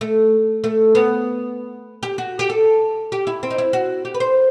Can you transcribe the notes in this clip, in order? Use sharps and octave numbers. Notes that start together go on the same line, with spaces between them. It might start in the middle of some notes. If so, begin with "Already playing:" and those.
A3
A3
B3
G4
F#4
G4
A4
G4
E4
C4
D#4
E4
F#4
G4
B4
C5